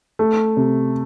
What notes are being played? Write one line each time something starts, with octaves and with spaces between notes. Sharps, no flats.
A3
C3